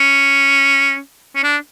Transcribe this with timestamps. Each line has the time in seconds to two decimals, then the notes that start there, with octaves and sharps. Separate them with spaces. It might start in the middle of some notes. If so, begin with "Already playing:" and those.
Already playing: C#4
1.36 C#4
1.43 D4